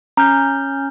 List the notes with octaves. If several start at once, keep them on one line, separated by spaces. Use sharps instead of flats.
C#4 A#5 F6 G6